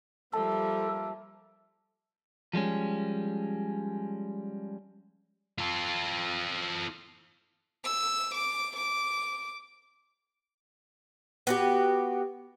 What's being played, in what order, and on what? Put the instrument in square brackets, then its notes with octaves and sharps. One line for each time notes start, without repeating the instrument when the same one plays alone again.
[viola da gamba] F3 G3 [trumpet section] A#3 E5 [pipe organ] A4 [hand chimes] A5
[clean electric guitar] F3 G3 G#3 C#4
[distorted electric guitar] F4 A4
[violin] E6
D6
D6
[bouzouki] B3 F#4 G4